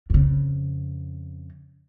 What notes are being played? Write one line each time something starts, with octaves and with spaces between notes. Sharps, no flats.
F2 C#3